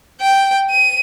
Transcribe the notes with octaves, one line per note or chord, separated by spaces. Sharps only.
G5
D#7